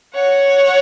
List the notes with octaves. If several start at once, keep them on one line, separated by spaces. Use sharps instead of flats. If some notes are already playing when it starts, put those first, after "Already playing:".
C#5 F#5